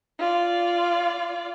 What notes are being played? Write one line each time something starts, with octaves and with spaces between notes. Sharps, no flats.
F4 D5